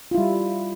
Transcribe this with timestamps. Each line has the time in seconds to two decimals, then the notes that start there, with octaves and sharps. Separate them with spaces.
0.11 F4
0.15 E4
0.18 G3